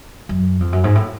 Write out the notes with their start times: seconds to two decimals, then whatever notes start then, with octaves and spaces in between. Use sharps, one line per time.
0.29 F#2
0.60 F2
0.72 F#2
0.84 G#2
0.95 A2